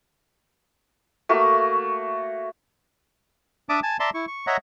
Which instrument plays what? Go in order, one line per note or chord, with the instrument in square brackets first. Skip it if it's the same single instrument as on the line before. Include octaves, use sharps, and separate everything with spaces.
[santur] A3 A#3 F#4
[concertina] D4 D5 E5 A5 D6 D#6
G#5 A5
D5 E5 A5 A#5 C6
E4 C#6
C#6
C#5 D#5 E5 F#5 A#5